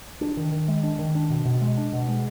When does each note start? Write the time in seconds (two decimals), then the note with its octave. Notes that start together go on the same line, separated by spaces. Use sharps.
0.21 D4
0.37 D#3
0.52 D#3
0.68 G#3
0.83 D4
0.99 D#3
1.15 D4
1.30 B2
1.45 B2
1.61 G#3
1.77 D4
1.92 B2
2.09 G#3